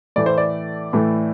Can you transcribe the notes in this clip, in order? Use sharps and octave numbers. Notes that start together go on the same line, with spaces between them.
A2 E3 A3 D5
C5
D5
A2 E3 A3